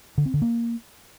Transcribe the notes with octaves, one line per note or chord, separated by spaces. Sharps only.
D3
C4
D3
A#3